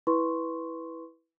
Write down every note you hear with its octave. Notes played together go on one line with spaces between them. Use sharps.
E4 B4 C6 C#6